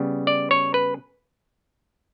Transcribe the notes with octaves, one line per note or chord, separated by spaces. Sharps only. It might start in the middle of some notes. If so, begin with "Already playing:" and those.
Already playing: C#3 G3 B3
D5
C#5
B4